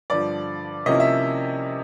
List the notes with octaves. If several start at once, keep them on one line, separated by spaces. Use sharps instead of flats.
G2 D3 F3 D5
C3 F3 A#3 C#4 E4 D#5
E5